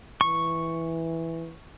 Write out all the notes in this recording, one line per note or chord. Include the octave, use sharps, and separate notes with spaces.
E3 C#6